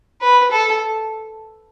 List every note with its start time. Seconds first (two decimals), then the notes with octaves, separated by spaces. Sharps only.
0.22 B4
0.51 A4